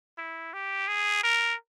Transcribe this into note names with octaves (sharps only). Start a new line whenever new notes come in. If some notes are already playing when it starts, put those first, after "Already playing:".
E4
G4
G#4
A#4